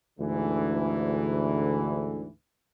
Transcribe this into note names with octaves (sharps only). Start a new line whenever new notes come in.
D2 G#2 D3 E3